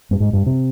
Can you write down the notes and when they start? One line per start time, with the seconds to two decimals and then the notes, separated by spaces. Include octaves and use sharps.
0.11 G2
0.20 G#2
0.33 G2
0.46 C3